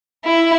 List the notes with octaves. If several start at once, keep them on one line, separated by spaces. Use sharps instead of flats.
E4